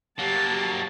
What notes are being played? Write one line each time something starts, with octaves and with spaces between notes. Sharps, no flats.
F#3 A#3 G4 A5